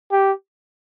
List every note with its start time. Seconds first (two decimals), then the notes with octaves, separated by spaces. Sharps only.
0.12 G4